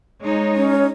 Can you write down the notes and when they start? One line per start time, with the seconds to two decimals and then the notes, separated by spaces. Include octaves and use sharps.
0.22 G#3 D#4 C#5
0.56 C#4